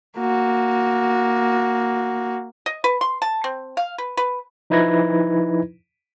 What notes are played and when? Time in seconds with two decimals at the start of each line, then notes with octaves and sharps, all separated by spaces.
0.18 A#3 F#4
2.66 D#5
2.84 B4
3.01 C6
3.22 A5
3.44 C4
3.77 F5
3.98 B4
4.17 B4
4.70 F3 D#4 E4 B4 G#6 A#6